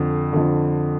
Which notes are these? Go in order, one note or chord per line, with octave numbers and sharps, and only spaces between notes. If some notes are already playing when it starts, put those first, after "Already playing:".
Already playing: F2 D3
F2 D3